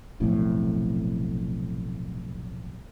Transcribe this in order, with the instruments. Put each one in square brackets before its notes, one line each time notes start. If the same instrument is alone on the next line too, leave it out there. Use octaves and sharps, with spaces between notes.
[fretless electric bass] F1 B1 F2 A2